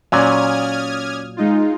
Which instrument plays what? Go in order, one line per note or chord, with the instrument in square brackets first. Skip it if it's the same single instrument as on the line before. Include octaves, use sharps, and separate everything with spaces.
[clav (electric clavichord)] A#2 F#3 G#5 [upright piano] C#4 D5 [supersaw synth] D#6 F6 G#6
[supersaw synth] G#3 D#4 F4